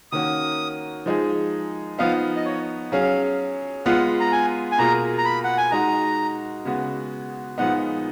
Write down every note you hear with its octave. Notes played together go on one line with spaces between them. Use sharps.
D#3 A#3 C#4 F#4 D#6
F3 G#3 D#4 G#4
F3 B3 D#4 F5
D#5
C#5
F#3 C#4 G#4 F5
G#3 B3 F4 F#5
A#5
G#5
G#5
B2 A#3 F4 G#4 A#5
A#5
B5
F#5
G#5
G#3 D#4 F#4 A#5
C#3 G#3 B3 F#4
A#2 F3 G#3 B3 D#4 F#5